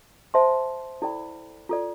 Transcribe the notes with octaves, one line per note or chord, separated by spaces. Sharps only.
C5 E5 A5 C6
E4 A4 D5 G5 B5
F4 A4 D5